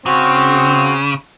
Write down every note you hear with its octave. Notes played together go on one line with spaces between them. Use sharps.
C#3 C4 F#4